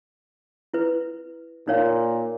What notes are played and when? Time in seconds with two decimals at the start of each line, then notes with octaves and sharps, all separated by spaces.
0.74 E4 B4
1.68 A#2 D#4 C#5 F5